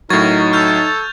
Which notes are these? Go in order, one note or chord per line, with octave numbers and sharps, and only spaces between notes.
A2 F#3 D#4 A#4 C#6 G#6 A6
A4 F6 G6 F7